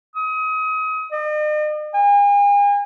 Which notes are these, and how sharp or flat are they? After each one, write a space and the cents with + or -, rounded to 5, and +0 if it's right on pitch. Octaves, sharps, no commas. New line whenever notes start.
D#6 +30
D#5 -45
G#5 -40